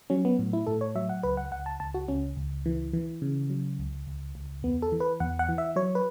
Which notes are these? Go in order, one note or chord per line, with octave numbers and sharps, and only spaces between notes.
F#3 C#4
B3
A2
E4
A2 A4
C#5
F#3 E5
F#5
C#2 B4
F#5
C#2 F#5
A5
C#2 A5
F#4
C#2 C#4
C#2
E3
E3
C#3
F#3
C#2
C#2
C#2
E2 B3
A4
E3
B4
E2 F#5
F#5
E3
E5
F#3 C#5
B4